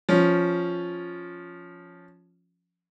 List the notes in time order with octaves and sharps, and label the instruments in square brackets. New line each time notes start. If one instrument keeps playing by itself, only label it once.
[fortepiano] F3 C#4